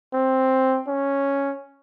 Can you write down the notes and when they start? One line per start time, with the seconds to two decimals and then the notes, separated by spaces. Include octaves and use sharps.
0.13 C4
0.88 C#4